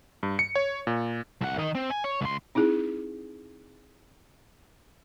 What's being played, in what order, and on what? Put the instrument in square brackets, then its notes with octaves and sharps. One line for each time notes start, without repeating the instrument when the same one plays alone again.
[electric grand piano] G2
C#7
C#5
A#2
[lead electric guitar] C2 F#5
D#3 D#5
C4
G#5
C#5
C#2 C6
[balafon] C4 D#4 E4 G#4